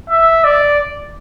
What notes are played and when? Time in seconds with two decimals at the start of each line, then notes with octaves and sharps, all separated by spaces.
0.10 E5
0.44 D5